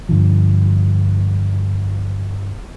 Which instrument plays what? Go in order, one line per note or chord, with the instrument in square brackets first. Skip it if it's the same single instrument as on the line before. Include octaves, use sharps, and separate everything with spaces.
[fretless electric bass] G2 D3 F3